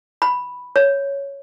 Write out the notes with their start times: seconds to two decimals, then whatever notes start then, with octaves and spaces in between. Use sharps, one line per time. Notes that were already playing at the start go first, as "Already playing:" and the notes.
0.22 B5
0.76 C#5